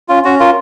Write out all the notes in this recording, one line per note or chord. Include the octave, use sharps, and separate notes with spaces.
C#4 F4
C#4 F#4
F4 A#4